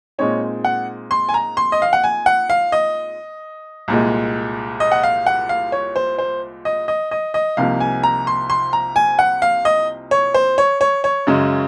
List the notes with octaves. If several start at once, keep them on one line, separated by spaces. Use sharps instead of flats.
A#2 G#3 C4 D#4 C#5
F#5
C6
G#5
A#5
C6
D#5
F5
F#5
G#5
F#5
F5
D#5
C2 A#2 G#3
D#5
F#5
F5
F#5
F5
C#5
C5
C5
D#5
D#5
D#5
D#5
C2 C3 F3 A#3 D#4 F5
G#5
A#5
C6
C6
A#5
G#5
F#5
F5
D#5
C#5
C5
C#5
C#5
C#5
F#2 C#3 G#3